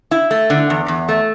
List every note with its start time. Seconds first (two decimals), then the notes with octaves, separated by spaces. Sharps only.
0.11 E4
0.31 A3
0.50 D3
0.70 E2
0.88 E2
1.09 A3